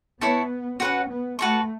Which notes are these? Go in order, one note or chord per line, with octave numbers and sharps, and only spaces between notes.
B3 E4 C#5 A5 C#6
C#4 F#4 B4 F#5
B3
A3 F#4 B4 A5 C#6